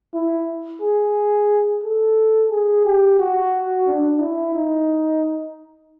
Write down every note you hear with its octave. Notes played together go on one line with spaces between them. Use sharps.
E4
G#4
A4
G#4
G4
F#4
D4
E4
D#4